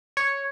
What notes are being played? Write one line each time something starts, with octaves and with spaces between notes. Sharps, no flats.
C#5